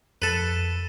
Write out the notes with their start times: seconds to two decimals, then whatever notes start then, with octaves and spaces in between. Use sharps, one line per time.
0.22 F2 A4 B4 A6